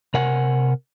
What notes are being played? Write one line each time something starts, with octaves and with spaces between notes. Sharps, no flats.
C3 A#4 F#5 G#5